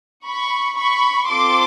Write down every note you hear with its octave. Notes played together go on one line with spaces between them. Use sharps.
B5 C#6
B5 C#6
C4 F4 A4 C6 D6